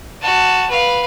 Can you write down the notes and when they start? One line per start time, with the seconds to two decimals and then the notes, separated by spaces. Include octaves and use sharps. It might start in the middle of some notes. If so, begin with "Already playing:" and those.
0.22 F#4 A5
0.69 B4 F5